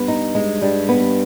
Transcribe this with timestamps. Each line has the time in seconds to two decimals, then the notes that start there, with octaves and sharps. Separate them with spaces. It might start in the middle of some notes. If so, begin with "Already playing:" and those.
Already playing: G2 B3
0.08 D#4
0.35 G#3
0.61 G2 G3
0.89 B3